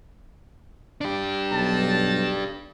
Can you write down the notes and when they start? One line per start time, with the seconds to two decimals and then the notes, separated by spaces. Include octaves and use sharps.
1.01 D4 G4
1.52 B1 A5